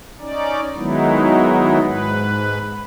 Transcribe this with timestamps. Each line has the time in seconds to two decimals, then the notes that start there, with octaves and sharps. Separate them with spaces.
0.20 C#4 D#4 D5
0.76 D#3 F#3 G#3 B3 D#4 E4
1.83 G#2 B4